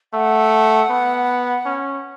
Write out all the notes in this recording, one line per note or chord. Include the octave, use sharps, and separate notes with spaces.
A3 F#5
B3
C#4